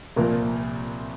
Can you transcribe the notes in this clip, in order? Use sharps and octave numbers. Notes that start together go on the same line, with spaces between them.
C2 A#2 F3 A#3